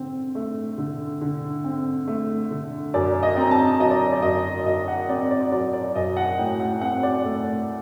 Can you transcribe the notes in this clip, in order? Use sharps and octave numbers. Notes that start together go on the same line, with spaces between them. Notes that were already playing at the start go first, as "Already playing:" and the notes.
Already playing: D3 C4
A3
D3
D3
C4
A3
D3
F#2 D5
D#5
C4 A#5
A5
F#3 D#5
D5
D5
F#2 D#5
F#2 D#5
F#5
C4 D5
D5
F#3 D5
D5
F#2 D#5
F#5
A2 G5
F#5
C4 F#5
D5
A3